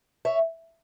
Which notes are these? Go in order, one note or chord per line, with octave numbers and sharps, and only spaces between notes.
C#5 E5